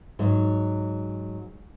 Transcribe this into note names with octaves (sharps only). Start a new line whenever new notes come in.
G#2 F#3